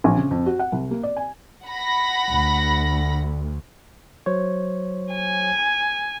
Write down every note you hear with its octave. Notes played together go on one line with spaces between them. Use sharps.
A#1
C#3
F2
F#4
F#5
C2
A#3
D5
G#5
F#5 B5 A#6
D2
F#3 C5 C#5
G#5